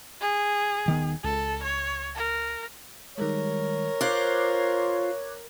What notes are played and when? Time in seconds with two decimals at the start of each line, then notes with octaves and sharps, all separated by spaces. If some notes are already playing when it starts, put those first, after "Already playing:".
0.21 G#4
0.86 D#1 D#3 B3
1.24 C#2 A4
1.63 C#5
2.16 A#4
3.18 D#3 G3 G#3 A#4 C#5
4.01 F4 C5 D6 F#6 G#6